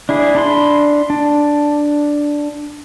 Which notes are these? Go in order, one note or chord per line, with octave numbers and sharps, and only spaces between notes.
D4 E4 G#4
D4 B5 C6
D4